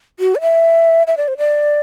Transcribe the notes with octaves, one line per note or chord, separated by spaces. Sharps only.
F#4
D5
E5
E5
D5
C5
D5